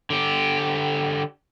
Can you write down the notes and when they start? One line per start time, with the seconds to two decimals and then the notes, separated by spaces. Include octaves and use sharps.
0.10 D3 G4